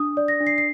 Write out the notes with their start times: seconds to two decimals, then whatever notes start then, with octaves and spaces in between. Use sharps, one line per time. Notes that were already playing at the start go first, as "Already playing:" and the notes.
Already playing: D4 D#6
0.17 D5
0.28 A#6
0.40 D4
0.47 C7
0.58 C7